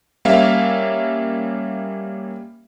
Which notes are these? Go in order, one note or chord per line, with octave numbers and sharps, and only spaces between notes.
G3 A#3 C#4 E5 F5